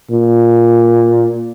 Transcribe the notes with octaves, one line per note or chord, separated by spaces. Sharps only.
A#2